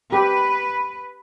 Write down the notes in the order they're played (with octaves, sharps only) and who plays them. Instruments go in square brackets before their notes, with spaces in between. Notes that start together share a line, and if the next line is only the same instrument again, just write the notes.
[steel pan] G4 [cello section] B4